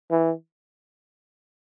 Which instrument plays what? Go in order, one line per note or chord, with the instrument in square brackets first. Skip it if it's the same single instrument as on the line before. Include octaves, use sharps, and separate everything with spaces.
[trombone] E3